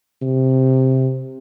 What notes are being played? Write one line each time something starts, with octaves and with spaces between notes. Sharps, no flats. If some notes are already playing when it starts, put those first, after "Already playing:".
C3